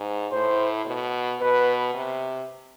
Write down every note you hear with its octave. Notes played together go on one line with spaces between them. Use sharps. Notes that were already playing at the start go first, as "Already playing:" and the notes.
Already playing: G#2
A2 C5
B2
B2 B4
C3